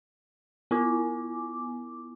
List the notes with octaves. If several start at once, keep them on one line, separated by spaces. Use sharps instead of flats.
B3 E4 D6